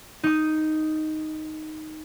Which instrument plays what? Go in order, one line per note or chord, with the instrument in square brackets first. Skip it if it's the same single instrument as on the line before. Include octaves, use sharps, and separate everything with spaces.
[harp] D#4 D#6